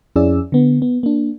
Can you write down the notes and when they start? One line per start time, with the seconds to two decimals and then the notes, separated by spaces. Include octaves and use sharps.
0.16 F2 C#4 E4 G#4 D5 E6
0.52 D3 B3
0.82 B3
1.03 A#3 D4